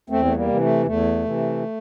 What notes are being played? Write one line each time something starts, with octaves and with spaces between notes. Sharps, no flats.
E2 A3 C4
A3
G3 A#3
C3 E3
A3
E2 A3
C3 E3